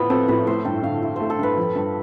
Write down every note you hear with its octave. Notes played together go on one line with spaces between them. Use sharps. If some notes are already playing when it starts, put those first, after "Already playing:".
Already playing: A2 F3 B3 F4
C4 A4
A2 B4
A3 C5
G2 G5
D3 F5
E4
A3 C5
A4
G2 B4
F3
G2